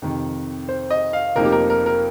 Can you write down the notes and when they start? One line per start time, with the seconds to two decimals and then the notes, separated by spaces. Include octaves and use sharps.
0.02 F2 C3 D#3
0.69 C5
0.91 D#5
1.13 F5
1.36 F1 F2 F3 A#3 D#4 A#4
1.45 G4
1.52 A#4
1.70 A#4
1.86 A#4